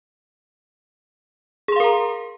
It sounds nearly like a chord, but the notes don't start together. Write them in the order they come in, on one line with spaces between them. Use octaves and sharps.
G#4 C6 F5 A#4 A#5